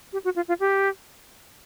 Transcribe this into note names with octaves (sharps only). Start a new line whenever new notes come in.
G4
F#4
F4
F4
G4